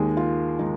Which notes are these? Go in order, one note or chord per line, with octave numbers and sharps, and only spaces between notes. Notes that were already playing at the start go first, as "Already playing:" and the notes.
Already playing: D#2 D#3 G#3 G#4
F4
D#3 G#3 D#4